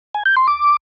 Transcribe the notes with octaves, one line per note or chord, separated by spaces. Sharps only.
G#5
G6
C6
D6